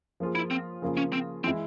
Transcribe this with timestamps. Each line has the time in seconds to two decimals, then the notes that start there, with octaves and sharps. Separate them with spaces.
0.20 F3 A#3 F4 G#4
0.35 E4
0.51 C4
0.82 C#3 F3 A#3 F4 G#4
0.97 C#4
1.13 C4
1.44 E3 G#3 C4 E4